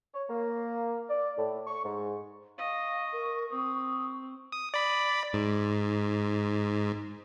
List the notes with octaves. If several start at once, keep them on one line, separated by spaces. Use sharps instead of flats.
C#5
A#3
D5
A2
C#6
G#2
D#5 F5 C#6
A#4
C4 D#6
D#6
D5 B5
G#2